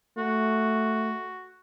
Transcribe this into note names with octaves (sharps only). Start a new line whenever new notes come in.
A3 F#4